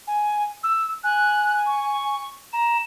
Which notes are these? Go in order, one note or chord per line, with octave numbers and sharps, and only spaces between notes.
G#5
E6
G#5 F#6
C#6
A#5 E7